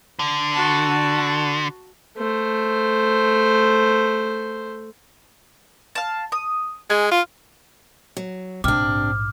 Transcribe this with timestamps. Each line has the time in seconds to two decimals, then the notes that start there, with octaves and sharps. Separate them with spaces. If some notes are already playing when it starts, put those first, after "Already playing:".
0.19 D3
0.54 F#4 A5
2.18 A3 C5
5.95 F5 A5
6.32 D#6
6.90 G#3 G#4 G#5
7.11 F4 F6
8.17 F#3
8.64 A#1 G#2 C3 D4 D6 F6